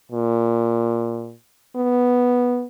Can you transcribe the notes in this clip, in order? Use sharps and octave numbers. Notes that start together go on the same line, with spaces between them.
A#2
B3